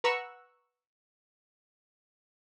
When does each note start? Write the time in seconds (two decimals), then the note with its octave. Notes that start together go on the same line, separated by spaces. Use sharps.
0.04 B4 F#5 A#5 C#6 E6 F#6